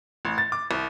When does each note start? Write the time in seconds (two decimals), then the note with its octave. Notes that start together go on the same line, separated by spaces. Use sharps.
0.25 A1
0.38 A6
0.52 D6
0.71 C2